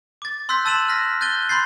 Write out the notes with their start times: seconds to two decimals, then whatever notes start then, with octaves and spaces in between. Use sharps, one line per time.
0.22 D6 A6
0.49 C6 E6 F#6 G6 B6
0.65 A5 E6 A6 D#7 E7 F#7
0.88 F6 F#6 A#6 B6
1.21 F#6 G6 A6 D#7 G7
1.49 B5 C6 G6 A6 C7